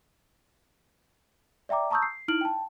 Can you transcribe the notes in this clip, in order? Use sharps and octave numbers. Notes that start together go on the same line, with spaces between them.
D5 E5 G5 A#5 D6
A5 A#5 C#6 D#6 E6 G6
C7
D#4 E4 F6 D7 F#7
G5 A5